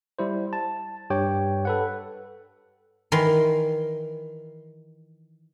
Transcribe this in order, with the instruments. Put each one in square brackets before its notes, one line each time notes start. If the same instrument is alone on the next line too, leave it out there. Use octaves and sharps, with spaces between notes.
[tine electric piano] G3 E4 C5
A5
G2 G4 C#5 G5
A4 B4 F#5
[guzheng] D#3 E3 A#4 C6